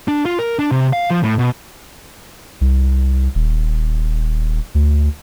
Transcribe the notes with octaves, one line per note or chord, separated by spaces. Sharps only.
D4
F4
A#4
D4
C3
F5
F3
A2
B2
C2
D#1
D2